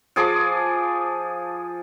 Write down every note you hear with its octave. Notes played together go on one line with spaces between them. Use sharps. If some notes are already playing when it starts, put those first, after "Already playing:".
F3 G#4 D6